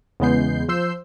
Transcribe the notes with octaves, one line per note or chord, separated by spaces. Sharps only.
E2 C#3 G#3 B3 G6 C7
F3 C5 E6 G6 C7